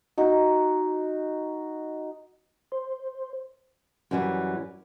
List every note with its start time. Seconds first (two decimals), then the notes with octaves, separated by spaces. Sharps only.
0.18 D#4 F#4
2.72 C5
4.11 F#2 E3 G3